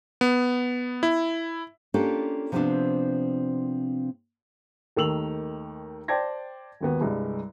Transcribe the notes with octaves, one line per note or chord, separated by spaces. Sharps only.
B3
E4
A#3 C#4 D4 F4 G4 A4
C3 F3 G3 B3 C4 D4
D#2 D#3 A3 E6 F7 F#7
C5 D5 G5 A5 G#6 A#6
G#1 D#2 B3
C2 G2 G#3